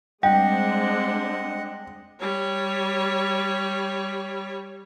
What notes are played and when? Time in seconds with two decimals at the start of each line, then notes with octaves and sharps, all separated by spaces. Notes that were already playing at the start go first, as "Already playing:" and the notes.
0.23 G3 G#3 C4 D4 D#5 F#5 G5
2.20 G3 C#5